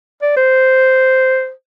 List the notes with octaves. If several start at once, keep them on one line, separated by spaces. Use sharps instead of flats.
D5
C5